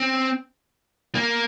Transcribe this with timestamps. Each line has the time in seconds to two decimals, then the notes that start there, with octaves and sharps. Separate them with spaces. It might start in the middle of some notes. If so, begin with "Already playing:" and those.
Already playing: C4
1.15 A#3